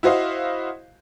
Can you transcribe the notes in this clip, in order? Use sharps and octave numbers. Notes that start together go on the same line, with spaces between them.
E4 F#4 C5 D#5 F5